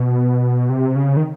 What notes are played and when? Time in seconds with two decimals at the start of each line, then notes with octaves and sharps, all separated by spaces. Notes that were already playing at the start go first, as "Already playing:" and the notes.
Already playing: B2
0.69 C3
0.96 C#3
1.17 D#3